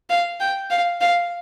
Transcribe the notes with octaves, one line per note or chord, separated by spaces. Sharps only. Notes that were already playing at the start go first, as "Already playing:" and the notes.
F5
G5
F5
F5